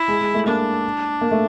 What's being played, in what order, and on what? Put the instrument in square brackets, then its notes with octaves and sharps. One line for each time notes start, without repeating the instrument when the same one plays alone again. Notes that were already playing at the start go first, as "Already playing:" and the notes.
Already playing: [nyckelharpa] E4
[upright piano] G#3
G#3
A3
[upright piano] A#3 [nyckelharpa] D4
[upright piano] A#3
A3